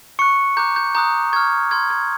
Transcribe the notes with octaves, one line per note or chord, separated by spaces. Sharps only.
C#6 F#6 C#7
A#5 D6 F#6 G6
G6
A#5 D#6 F#6 G6
C#6 F6 G#6
C6 F6 G#6
G#6